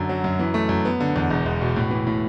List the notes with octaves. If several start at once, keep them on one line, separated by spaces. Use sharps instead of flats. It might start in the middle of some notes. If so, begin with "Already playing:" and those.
Already playing: F#2 D3
F#3
F#2
E3
A3
F#2
B3
D3
E2
E1
E1
B2
A2
E3
A2